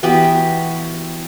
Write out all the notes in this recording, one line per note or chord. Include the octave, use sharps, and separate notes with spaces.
E3 B3 F#4 G4